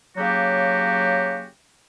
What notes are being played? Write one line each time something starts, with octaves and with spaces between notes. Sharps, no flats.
C#3 F#3 A#3 F#4 G4